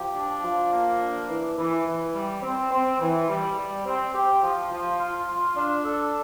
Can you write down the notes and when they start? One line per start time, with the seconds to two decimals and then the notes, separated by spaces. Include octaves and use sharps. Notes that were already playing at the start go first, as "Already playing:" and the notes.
Already playing: F3 G4
0.16 D4
0.44 F3
0.72 A#3
1.01 D4
1.30 E3
1.58 E3
1.86 E3
2.15 G3
2.43 C4
2.71 C4
3.00 E3
3.28 G3
3.57 G3
3.85 C4
4.14 G4
4.43 F3
4.71 F3
4.99 F4
5.28 F4
5.56 D4
5.85 A4